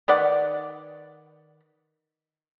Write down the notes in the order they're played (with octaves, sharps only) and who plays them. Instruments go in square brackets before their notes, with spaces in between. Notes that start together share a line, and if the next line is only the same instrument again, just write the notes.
[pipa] D#3 B4 D5 F#5